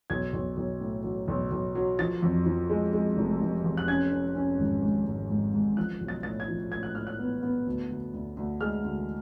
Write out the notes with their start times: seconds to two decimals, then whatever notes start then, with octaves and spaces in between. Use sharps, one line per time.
0.10 B1 G#6
0.33 B1
0.57 B1
0.80 A2
1.04 F#3
1.28 B1
1.52 B1
1.75 F#3
1.99 F3 A6
2.22 F2
2.46 F3
2.70 G#3
2.93 G#3
3.17 F1
3.41 F1
3.64 F2
3.77 F#6
3.88 C#4 G#6
4.12 C#4
4.35 C#4
4.59 G#1
4.82 G#2
5.06 G#2
5.30 G#2
5.54 G#2
5.77 F3 F#6
6.01 B1
6.08 A6
6.23 A2 A6
6.40 G#6
6.48 F3
6.71 A2 G#6
6.83 F#6
6.95 A2 F6
7.07 F#6
7.19 B3
7.43 B3
7.66 D2
7.90 D2
8.13 D2
8.37 D2
8.60 G#3 F6
8.84 D2